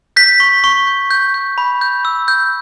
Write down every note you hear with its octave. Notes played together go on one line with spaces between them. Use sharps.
G6 B6
C#6
C#6
G6
G6
G6
B5
G6
E6
G6